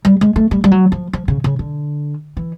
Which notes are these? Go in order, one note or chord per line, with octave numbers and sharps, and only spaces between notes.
G3
G#3
A3
G3
G3
F#3
F3
F3
C#3
C#3
D3
E3